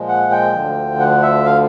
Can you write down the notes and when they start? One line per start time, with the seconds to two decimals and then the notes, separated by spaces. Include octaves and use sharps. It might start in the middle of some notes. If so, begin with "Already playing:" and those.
Already playing: A#2 F3 G#3
0.09 F#5
0.32 G5
0.54 D2 D3 F3
1.00 F#5
1.23 E5
1.46 F5